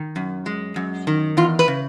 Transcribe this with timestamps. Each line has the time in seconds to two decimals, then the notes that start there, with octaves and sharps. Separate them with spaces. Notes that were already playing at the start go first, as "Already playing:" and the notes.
Already playing: D#3
0.16 F#2
0.46 G#3
0.76 F#2
1.07 D#3
1.37 E2 F4
1.59 B4
1.68 C#3